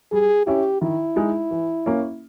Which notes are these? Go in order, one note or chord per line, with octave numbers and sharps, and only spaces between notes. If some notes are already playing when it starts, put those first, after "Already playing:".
G3 G#4
C#4 E4 G4
D#3 E4
G#3 D#4
E3
A#3 C#4